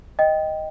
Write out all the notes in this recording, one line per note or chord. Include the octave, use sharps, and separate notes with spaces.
D#5 G5